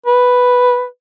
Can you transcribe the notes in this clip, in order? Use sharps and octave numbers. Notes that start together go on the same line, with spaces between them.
B4